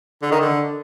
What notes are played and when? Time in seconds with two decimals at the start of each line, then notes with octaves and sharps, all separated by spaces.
0.22 D3
0.32 D#3
0.41 D3